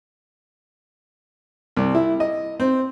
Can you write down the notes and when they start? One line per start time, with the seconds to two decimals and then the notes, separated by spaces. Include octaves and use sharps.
1.77 C2
1.95 E4
2.20 D#5
2.60 C4